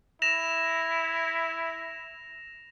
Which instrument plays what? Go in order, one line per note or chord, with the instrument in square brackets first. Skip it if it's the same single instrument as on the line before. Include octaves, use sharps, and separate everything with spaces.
[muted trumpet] E4 [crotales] A#6 E7 F7